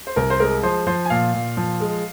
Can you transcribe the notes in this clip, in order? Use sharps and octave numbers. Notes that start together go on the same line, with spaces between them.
C5
C2 A#4
C5
G#3 A#4
F3 C5
F3 C5
G#5
A#2 F5
A#2
F3
G#3